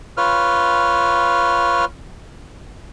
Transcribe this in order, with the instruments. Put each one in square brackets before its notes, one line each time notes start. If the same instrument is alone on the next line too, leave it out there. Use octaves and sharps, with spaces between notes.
[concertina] F4 B4 C#5 F6